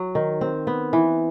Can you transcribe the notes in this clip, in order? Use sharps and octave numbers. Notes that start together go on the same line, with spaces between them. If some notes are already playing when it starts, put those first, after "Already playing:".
Already playing: F#3
D#3
C4
B3
E3